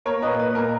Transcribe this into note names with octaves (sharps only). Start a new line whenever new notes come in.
A#3 A#4 C#5
A#2 B4 D#5
A#3 B4
A#2 A#4